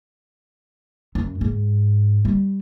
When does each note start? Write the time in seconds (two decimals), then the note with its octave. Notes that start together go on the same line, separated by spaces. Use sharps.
1.15 F#2
1.41 G#2
2.25 G3